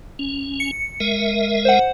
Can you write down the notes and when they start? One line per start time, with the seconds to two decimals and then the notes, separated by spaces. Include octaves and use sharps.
0.19 C#4
0.60 C#7
1.00 G#3 A#4 E5
1.65 C5 F#5